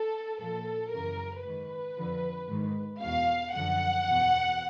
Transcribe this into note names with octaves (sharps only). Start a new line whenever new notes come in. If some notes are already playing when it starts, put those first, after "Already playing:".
Already playing: A4
A#2 F3 A4
F#2 C#3 E3 A#4
G#2 D#3 B4
F2 D3 F3
G#2 D#3
E2 B2 F5
F#2 D3 F3 F#5
E2 B2